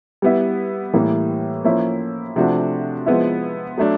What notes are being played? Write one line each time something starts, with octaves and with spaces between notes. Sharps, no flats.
G3 B3 E4
A2 E3 G3 A#3
F3 A#3 C#4 E4
C3 F3 A3 D4 F#4
F3 G#3 B3 E4
F#3 A3 D4